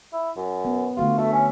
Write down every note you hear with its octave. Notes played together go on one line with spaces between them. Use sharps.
E4
F#2
B3
D3 A3 F4 F#4
A3 F#4 E5
C#4